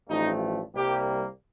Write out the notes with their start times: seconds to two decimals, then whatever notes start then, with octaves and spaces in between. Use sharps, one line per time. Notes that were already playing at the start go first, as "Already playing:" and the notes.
0.09 A1 G2 F3 A3 D#4
0.75 C2 C3 G3 A#3 G4